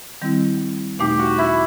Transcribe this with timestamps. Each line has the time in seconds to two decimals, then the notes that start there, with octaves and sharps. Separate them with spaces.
0.22 D#3 G3 C4 E4
0.99 E2 B2 A3 D#4 G4
1.19 F#4
1.38 E4